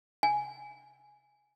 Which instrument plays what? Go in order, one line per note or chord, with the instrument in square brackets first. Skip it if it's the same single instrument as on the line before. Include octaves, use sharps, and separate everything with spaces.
[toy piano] G#5